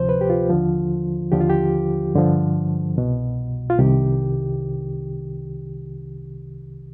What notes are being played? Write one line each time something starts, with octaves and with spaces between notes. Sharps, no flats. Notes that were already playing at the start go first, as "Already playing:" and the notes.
Already playing: D2 C3 F3 C5
B4
G4
F4
D#2 D3 F3
D#2 D3 F3 G4
F4
G4
G2 D3 F3
C2 B2
F4
C2 C3 D#3 G4